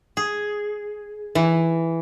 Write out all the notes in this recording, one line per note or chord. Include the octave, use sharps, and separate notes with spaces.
G#4
E3